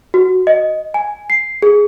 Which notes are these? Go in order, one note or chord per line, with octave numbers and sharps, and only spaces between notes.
F#4
D#5
G#5
C7
G#4